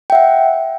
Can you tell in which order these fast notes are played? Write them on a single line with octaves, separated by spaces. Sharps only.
G5 E5 F#5